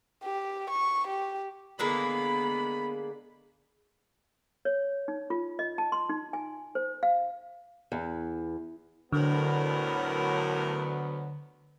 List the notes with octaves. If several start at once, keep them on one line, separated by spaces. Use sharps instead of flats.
G4
C#6
G4
D3 G#3 A#3 B3 B5
C#5
D#4
F4
D#5
A5
C6
D#4
G#5
C5
F5
E2
D2 A2 D3 F#3 B3 A#4